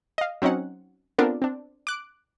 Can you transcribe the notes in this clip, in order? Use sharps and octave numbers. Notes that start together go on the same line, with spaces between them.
D#5 F5
F#3 C4 C#4 D#4 F#5
B3 C4 D4 F4 A4 A#4
C4 D4
D6 F#6 D7